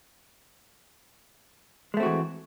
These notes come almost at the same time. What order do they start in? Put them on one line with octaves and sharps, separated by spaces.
G#3 A3 C4 F#4 E3